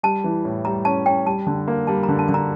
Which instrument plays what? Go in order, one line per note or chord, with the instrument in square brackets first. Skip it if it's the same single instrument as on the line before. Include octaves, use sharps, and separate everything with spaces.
[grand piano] G3 [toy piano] A5
[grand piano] E3
A2
[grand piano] G3 [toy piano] A#5
[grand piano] C#4 [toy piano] A5
[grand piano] C#4 [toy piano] G5
[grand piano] G3 [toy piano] A5
[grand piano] D3
A#3
[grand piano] G3 [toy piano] A5
[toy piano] A#5
[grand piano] D3
[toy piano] A5
[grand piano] D3
[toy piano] A#5